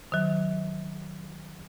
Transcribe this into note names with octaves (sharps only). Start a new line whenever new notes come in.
D#3 F#3